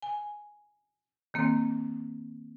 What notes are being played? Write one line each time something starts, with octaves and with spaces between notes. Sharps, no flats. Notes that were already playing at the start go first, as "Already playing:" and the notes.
G#5
D#3 A#3 C4